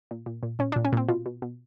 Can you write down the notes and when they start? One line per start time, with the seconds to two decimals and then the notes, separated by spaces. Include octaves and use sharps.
0.11 A#2
0.26 A#2
0.43 A#2
0.59 A#2 C#4
0.72 A#2 D4
0.85 C#4
0.93 A#2 C4
1.09 B2 F4
1.26 B2
1.42 B2